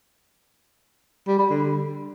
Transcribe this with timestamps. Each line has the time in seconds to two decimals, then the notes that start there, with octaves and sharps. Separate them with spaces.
1.27 G3
1.39 G3
1.50 D3